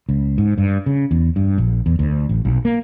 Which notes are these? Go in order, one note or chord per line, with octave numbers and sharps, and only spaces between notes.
C#2
G#2
G2
C#3
E2
G2
A#1
E2
D2
A1
B1
A#3